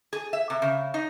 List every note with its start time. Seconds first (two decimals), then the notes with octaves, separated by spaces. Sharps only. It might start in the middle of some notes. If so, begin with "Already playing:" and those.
0.13 G#4
0.33 E5
0.50 C3
0.62 C#3
0.94 D#4